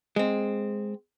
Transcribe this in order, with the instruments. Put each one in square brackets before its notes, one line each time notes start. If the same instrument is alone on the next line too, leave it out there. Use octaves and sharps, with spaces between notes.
[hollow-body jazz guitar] G#3 C4